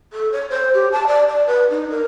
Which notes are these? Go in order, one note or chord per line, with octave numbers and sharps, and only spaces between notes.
A4
C#5
C5
G4
A5
D5
D5
B4
D#4
A#4